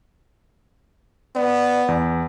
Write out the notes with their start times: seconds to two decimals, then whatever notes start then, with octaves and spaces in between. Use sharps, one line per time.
1.35 B3 D5
1.88 E2